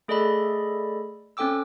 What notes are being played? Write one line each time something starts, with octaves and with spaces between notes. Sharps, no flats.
A3 G#4 A4 D5 D#5 B5
C4 C#4 A4 G5 D6 E6